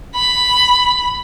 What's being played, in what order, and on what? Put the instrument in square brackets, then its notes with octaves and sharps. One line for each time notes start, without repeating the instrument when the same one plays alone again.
[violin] B5